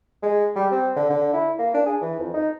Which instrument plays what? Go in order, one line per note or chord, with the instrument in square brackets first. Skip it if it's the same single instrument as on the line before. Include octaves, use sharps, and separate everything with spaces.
[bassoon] G#3
G3
C4
D3
D3
E4
A#3
D4
G#4
E3
F2
D#4